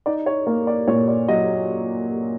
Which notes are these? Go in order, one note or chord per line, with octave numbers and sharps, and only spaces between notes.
D#4 D5
C#5
A#3 C#5
D5
A#2 C#5
D5
F#3 D#5